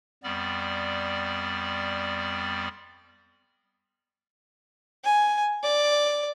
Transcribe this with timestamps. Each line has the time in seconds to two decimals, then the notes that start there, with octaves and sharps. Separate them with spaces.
0.23 F2 G3 B3 D5
5.04 G#5
5.63 D5